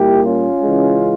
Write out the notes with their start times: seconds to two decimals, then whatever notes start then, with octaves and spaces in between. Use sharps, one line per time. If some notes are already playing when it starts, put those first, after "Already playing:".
Already playing: A#2 G3 A#3 E4 G4
0.24 C#4 F4
0.61 C#3 E3 G#3